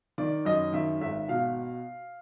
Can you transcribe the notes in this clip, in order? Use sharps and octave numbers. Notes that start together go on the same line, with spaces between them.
D#3 D5
F#2 D#5
D#3 E5
G#1 E5
B2 F5